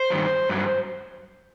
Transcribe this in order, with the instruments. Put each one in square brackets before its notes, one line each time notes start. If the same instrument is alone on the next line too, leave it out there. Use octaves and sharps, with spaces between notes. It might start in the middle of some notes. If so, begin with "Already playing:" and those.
Already playing: [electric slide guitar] C5
G2 D#3 F#3
G2 F#3